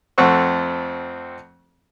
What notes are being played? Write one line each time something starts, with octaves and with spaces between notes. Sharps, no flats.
F2 A3 C4 F#5 C#6